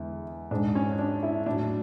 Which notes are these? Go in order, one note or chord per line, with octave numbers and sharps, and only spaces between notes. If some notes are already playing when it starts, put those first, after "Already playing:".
Already playing: E2 D3 G#3 E4
G#2 G#3 D4
C#4
D4
E4
A2 F#3 D4